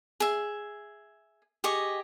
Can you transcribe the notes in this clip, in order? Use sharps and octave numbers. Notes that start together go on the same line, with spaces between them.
G#4 E5
G4 G#4 D#5 C#6